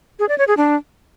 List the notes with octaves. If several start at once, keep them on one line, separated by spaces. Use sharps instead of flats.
G#4
D5
C#5
G#4
D4